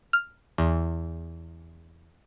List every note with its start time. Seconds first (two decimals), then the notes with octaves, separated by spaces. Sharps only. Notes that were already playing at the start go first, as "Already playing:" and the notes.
0.13 F6
0.58 E2